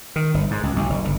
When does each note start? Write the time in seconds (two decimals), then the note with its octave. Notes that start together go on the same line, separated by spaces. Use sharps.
0.16 D#3
0.34 G1
0.51 G#2
0.63 C#2
0.76 B1
0.89 F#1
1.05 G1